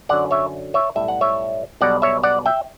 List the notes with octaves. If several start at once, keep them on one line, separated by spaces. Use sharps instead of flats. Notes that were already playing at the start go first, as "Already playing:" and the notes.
F#2 D3 F#3 D5 F#5
C#5 E5
C#5 E5
B1 A2 G3 E5
F#5
C#5 E5
B1 B2 G3 D5 F#5
C#5 E5
D5 F#5
E5 G5